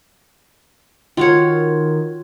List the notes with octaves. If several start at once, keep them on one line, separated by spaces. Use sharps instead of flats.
D#3 F4 F#4 C#5